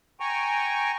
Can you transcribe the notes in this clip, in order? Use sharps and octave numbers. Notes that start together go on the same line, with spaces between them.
G5 G#5 A#5 C#6